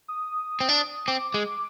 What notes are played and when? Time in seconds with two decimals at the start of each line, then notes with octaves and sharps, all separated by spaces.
0.08 D#6
0.61 C4
0.69 D4
1.08 C4 D6
1.34 G#3